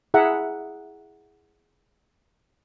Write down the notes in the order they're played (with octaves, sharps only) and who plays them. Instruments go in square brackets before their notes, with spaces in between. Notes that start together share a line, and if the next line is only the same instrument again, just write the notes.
[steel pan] E4 G#4 E5 F#5 A#5